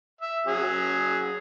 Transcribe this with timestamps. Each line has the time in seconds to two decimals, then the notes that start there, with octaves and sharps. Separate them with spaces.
0.21 E5
0.46 F#3 C#4 G#4